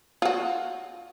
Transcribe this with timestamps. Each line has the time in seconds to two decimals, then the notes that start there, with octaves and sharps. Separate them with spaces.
0.22 F4 F#4